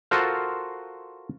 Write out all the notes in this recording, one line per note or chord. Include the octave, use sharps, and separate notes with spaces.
F4 F#4 A4 A#4 C5 F5